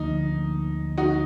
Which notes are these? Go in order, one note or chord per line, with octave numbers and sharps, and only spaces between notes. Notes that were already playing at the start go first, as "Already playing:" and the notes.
Already playing: D2 D3 F3 A#3 D#4
D#4 F#4